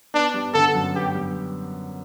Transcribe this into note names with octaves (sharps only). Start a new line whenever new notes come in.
B3 D4
G3
D3 A4
F#2
B3 G4
G3